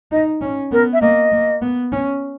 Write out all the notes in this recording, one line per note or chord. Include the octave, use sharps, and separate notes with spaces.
D#4 D#5
C#4
B3 A#4
E5
A#3 D#5
A#3
B3
C#4